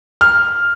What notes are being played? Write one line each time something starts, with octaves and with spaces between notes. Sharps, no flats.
F6